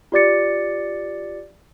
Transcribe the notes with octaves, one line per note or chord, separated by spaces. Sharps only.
F4 G4 D5 D6 A6 C#7